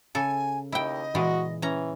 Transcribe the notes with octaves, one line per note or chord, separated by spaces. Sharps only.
C#3 A4 G#5
D#2 E4 D#5 G5
A#2 E3 G#3 F#4
E3 C#4 A#5